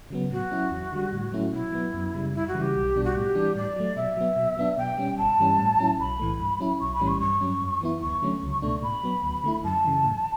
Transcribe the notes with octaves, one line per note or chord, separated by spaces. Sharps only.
C#3 F#3 B3
A2 F#4
F#3 C#4 E4
E2
D3 G3
A2
F#3 A3 C#4 E4
B2 E4
F#3 B3
F#2
C#3 G3
F#2 E4
F#4
C#3 E3 G3
G4
B1
B2 G3 D4
F#4
A2 G4
E3 G3 D4
A2 D5
F#3 A3
B2 E5
F#3 B3
B2
F#3 B3 D4
B2 G5
G3 C#4
G1 A5
G2 E3 G3 C#4
A2
F#3 C#4 E4
B1 B5
A2 E3 A3
G2
F#3 C#4 E4
B1 C#6
B5
A2 E3 G3 C#4
C#6
G2 C#6
F#3 C#4
F#2
E3 B3 E4
D2 C#6
D3 F#3 A3 C#4
C#2
B2 A3 D4
A2 B5
F#3 B3
D2
D3 A3 E4
F#2 A5
C#3 E3
A2